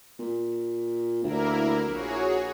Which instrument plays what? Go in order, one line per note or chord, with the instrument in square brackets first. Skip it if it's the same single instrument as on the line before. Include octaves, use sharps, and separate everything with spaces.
[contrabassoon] A#2
[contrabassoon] D2 [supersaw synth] A#3 E4 A#4
[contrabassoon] A#1 [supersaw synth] F#4 G#4 C#5